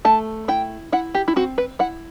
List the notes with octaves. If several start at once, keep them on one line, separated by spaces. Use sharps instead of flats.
A3 A5
E4 G5
E4 F#5
G4
E4
C4 F#4
B4
E4 F#5